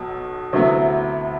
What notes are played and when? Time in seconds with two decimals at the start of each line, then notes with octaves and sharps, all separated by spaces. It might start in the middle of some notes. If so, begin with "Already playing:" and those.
Already playing: B1 B2 F#3
0.53 D2 C3 F#3 B3 E4